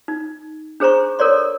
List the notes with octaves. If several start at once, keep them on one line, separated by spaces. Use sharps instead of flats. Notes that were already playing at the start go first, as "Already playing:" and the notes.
D#4
D4 G#4 C5 A#5 C#6
A4 A#4 C#5 D5 C6